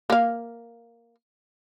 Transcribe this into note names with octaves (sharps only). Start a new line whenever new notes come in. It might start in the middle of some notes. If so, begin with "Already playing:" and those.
A#3 F5